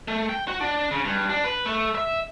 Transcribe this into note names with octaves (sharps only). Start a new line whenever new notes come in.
A3
G5
F#4
D4
C#3
G2
D4
B4
A3
E5